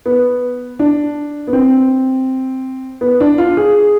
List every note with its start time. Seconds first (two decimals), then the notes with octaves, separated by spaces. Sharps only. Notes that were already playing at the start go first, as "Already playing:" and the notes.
0.06 B3
0.79 D4
1.47 B3
1.53 C4
3.01 B3
3.20 D4
3.38 F4
3.57 G#4